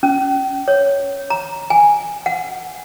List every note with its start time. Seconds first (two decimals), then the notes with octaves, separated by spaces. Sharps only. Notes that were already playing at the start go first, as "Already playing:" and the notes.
0.03 C#4
0.68 C#5
1.30 A#5
1.70 G#5
2.26 F#5